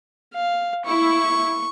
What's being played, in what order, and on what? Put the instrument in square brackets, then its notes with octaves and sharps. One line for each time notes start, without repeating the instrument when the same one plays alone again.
[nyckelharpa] F5
[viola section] E4 [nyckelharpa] C#6